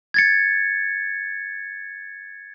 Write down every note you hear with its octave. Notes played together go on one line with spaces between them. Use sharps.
G#6 A6 C#7